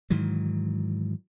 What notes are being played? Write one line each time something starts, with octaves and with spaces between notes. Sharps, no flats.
G#2 D#3 E3 F#3